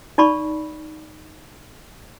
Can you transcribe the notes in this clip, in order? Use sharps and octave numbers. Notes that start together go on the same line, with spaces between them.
D#4 D5 A5 B5 C#6